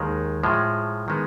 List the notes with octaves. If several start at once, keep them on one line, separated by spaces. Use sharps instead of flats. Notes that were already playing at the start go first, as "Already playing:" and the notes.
Already playing: D#2 D#3 G#3
A2 F3 G#3
D#3 G#3 B3